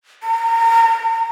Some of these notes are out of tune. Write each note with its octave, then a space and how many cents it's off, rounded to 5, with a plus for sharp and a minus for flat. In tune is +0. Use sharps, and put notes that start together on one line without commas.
A#5 -30